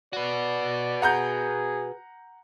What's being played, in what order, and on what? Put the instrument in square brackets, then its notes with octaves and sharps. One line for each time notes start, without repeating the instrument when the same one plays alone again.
[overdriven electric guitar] F#4 B4 [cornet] D5
[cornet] G#4 [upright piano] F#5 A#5 G6